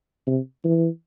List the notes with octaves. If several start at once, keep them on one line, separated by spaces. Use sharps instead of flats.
C3
E3